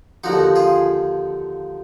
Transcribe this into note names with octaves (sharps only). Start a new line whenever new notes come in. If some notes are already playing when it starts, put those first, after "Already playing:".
D#2 D3 F3 D#4 F#4
F4 G#4